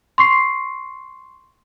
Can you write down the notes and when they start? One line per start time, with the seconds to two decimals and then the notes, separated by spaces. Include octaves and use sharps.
0.18 C6 C#6 C7